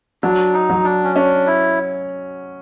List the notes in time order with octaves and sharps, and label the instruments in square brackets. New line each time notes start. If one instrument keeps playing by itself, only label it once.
[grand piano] F#3 [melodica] D4
[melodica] D#4
[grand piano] F#3
[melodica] D4
C#4
[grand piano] C#4 [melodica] D4
[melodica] E4